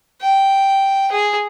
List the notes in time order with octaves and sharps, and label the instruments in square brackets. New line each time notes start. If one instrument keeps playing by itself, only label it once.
[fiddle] G5
G#4